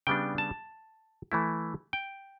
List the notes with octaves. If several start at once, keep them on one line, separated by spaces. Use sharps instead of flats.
C#3 G3 B3 D4 G5
A5
E3 A3 E4
G5